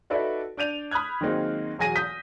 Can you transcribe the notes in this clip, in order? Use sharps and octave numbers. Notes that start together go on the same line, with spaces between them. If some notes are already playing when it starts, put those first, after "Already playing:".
D#4 F#4 A4 B4 D5 E5
D4 D5 G6 D#7 F7
B5 D#6 F6 F#6 G#6
D#3 F#3 G#3 A#3 C4 D#4
E1 F#3 G#4 G#5 A#6 D#7
D#6 G6 B6